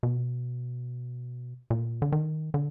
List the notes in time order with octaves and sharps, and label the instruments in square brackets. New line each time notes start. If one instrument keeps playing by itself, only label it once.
[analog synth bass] B2
A#2
D3
D#3
D3